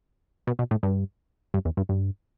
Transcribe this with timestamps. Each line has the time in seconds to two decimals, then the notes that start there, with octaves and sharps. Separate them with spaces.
0.47 B2
0.59 B2
0.71 A2
0.83 G2
1.54 G2
1.65 E2
1.77 G2
1.89 G2